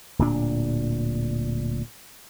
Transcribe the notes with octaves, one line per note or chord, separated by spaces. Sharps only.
D1 A#2 D4